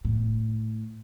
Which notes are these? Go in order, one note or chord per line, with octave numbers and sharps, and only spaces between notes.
A2